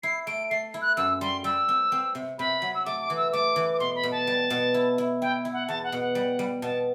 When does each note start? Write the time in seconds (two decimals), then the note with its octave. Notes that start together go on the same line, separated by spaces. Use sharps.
0.03 E4 C7
0.27 A3 D7
0.51 A3 C7
0.74 E4
0.82 F#6
0.97 F#2 E6
1.21 G3 C6
1.44 G3 E6
1.69 C4
1.92 C4
2.15 C3
2.39 C3 B5
2.62 F#3
2.75 E6
2.86 A3 D6
3.02 D6
3.10 E3
3.17 E6
3.33 A3 D6
3.56 E3
3.73 D6
3.80 B2 C6
3.96 B5
4.03 B2
4.12 A5
4.27 G3
4.50 B2
4.74 E4
4.98 E4
5.21 E4 G5
5.45 E4
5.53 F#5
5.68 E2 A5
5.84 F#5
5.92 B2
6.00 F#5
6.15 G3
6.39 G3
6.62 B2 A5